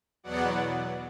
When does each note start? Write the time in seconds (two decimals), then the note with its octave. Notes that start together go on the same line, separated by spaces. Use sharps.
0.23 E2 B2 F#3 B3 D5 F#5